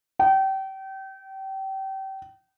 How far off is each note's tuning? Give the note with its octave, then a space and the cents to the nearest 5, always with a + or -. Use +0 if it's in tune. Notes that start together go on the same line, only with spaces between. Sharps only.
G5 -30